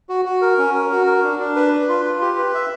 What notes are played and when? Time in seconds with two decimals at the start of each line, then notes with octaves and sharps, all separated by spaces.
0.09 F#4
0.25 F#4
0.42 A#4
0.58 C#4
0.75 A#4
0.92 F#4
1.07 A#4
1.24 D4
1.40 D4
1.56 B4
1.73 B4
1.89 F4
2.05 F4
2.22 G4
2.38 B4
2.55 E5